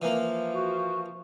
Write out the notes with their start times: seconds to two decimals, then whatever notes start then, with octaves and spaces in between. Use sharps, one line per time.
0.02 E3 F3 A#3
0.53 F#4